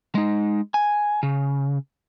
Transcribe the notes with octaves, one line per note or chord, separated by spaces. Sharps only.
G#3 D#4
G#5
C#3